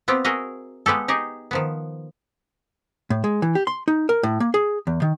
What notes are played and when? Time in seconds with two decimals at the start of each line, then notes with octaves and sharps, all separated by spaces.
0.08 B3 C4 F4 G4
0.24 F#4 G#4 A#4 D#5 E5
0.86 G#3 B3 G4 A4
1.08 D#4 G4 G#4 D#5
1.51 D#3 F3 B3
3.10 A2
3.24 G#3
3.42 E3
3.55 G4
3.67 C6
3.88 D#4
4.09 A#4
4.23 A2
4.40 A#3
4.54 G#4
4.87 E2
5.02 D#3